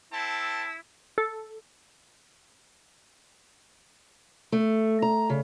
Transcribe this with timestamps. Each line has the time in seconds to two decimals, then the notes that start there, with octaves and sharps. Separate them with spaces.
0.13 C4 E4 A4 A5
1.18 A4
4.52 A3
5.02 A#5
5.30 C#3